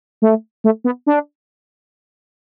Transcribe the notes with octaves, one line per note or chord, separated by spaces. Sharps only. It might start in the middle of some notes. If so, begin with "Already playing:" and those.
A3
A3
B3
D4